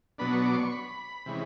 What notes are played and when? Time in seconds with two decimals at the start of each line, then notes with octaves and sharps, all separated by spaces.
0.18 B2 F#3 B3 D4 B5
0.32 C#6
0.46 D6
0.54 C6
0.59 C#6
0.72 B5
1.26 C3 E3 G#3 C#4